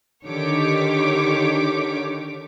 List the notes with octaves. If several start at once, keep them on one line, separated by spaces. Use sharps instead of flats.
D3 D#3 G4 C#5 D6 B6